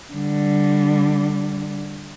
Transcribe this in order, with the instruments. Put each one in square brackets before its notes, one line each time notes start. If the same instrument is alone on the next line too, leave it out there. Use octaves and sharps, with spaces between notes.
[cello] D3 G3